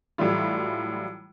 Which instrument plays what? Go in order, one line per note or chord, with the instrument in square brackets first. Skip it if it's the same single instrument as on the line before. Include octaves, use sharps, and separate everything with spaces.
[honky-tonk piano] A2 E3 F#3 G3 E4 F4